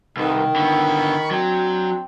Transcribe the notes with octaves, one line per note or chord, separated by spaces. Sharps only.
C2 D#3 D#4 A4 B4
D3 B3 B5 C#6
F#3 C4 D4 G5